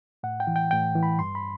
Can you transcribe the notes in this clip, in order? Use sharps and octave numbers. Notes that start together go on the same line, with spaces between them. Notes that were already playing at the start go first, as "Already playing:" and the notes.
A2 F#5
G5
E3
G5
A2 G5
E3
B5
G2 C6
B5